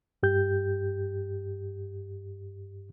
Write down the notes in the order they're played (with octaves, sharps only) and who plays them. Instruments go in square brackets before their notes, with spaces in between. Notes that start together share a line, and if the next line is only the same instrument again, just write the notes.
[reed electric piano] G2 G4 G6